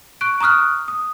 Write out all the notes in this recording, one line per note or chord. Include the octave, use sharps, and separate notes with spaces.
C#6 F#6 D7
A#5 C#6 D#6 F6 F#6
D#6